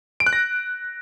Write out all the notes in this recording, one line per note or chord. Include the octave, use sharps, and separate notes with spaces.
D7
F#6
A#6